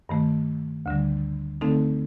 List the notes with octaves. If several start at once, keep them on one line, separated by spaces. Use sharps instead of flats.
G2 D#3 A3
D2 D3 G3
D3 A3 C4 D#4 A4